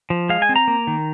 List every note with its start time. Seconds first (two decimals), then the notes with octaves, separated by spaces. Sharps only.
0.10 F3
0.29 G#3 F5
0.42 G#5
0.49 C4
0.56 A#5
0.68 A#3
0.87 D#3